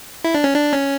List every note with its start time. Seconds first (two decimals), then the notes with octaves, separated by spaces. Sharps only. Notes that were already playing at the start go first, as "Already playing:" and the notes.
0.24 E4
0.35 D4
0.44 C#4
0.54 D4
0.73 C#4